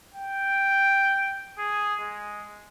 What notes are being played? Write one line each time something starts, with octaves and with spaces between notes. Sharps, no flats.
G5
G#4
G#3